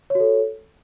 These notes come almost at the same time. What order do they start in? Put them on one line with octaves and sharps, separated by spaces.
C#5 F#4 A4